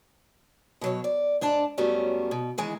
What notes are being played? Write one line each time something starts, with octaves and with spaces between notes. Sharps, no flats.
B2 F#3 C#5
D5
G#2 D4 D5 A5
F#2 F#3 G3 A3 B3 C#4
B2
D#3 E3 G#3